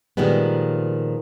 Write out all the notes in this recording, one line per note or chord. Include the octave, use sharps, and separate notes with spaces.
A#2 D#3 F3 G3 G#3 B3